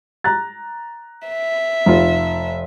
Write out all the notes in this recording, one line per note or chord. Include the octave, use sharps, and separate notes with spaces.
A#5 F#6 A6
E5
F1 F4